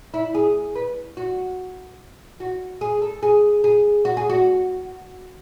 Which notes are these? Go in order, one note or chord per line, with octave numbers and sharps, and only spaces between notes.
E4
G#4
B4
F#4
F#4
G#4
A4
G#4
G#4
F#4
G#4
F#4